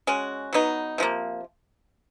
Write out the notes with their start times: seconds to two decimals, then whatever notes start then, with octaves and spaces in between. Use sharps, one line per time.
0.07 G#3 C#4 F#4
0.53 F#3 B3 D#4
0.98 C3 F3 A#3